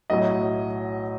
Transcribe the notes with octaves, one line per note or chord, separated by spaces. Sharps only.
B1 A2 F#3 D#5